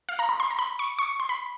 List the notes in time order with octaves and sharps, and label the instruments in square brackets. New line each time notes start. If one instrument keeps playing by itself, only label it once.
[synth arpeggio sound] F5
A#5
B5
C6
A#5
B5
C#6
C#6
C6
B5